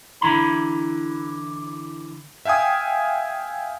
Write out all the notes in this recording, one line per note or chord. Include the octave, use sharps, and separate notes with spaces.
D3 E3 E4 A#5 B5
E5 F5 G5 G#5 D#6